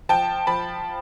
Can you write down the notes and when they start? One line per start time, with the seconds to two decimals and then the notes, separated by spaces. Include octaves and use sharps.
0.09 F3 G5 A5
0.47 F3 A5 B5